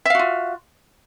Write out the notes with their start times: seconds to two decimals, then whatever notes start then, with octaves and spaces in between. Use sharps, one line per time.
0.05 E5
0.10 F5
0.15 F#4
0.19 F4